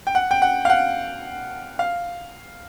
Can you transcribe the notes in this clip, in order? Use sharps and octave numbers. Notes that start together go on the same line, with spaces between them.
G5
F#5
G5
F#5
F5
F#5
F5